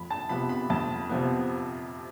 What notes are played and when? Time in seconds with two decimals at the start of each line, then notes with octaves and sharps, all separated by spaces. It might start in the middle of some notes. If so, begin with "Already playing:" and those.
Already playing: F2 B5
0.10 A5
0.29 C3 F3 B3 B5
0.49 B5
0.70 F2 A5
1.09 C3 F3 B3